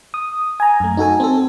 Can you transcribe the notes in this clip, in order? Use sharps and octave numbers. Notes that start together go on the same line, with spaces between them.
D#6
G#5 A#5
F#2 A3
D#4 F#4 A4 G#5
C4 A4